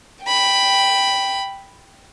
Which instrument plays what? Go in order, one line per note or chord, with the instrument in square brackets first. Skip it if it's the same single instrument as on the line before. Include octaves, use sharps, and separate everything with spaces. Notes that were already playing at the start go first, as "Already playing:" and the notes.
[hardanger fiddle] G5 B5